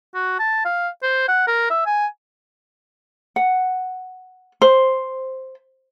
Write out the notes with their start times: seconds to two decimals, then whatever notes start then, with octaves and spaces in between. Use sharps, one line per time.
0.15 F#4
0.39 A5
0.65 F5
1.03 C5
1.28 F#5
1.47 A#4
1.70 E5
1.86 G#5
3.36 F#5
4.62 C5